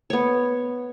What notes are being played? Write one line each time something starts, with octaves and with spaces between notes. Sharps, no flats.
B3 C#5